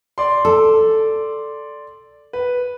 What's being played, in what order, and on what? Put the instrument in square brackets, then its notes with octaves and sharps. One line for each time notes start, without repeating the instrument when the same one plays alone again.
[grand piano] D5 C6
[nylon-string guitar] A4
[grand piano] B4